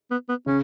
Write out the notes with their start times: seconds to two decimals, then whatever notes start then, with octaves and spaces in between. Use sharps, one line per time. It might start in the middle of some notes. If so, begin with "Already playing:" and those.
0.11 B3
0.28 B3
0.46 C#3 C#4